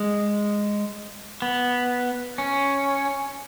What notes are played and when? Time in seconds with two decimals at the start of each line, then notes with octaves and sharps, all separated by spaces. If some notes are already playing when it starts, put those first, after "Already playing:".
Already playing: G#3
1.42 B3
2.38 C#4